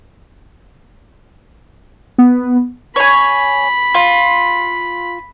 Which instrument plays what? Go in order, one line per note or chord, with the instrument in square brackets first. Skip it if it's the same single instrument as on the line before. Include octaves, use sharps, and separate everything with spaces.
[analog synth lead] B3
[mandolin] C#5 G#5 [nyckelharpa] B5
[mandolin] F4